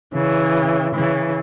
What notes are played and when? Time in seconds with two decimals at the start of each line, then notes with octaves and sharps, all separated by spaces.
0.13 C#3 E3
0.94 C#3 E3